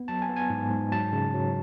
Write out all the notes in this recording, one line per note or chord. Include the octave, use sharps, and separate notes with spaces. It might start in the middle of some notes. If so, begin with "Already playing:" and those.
Already playing: B3
F#3 A5
G#5
B3
G#5
G#2
G#2
F#3 A5
C#3
F#3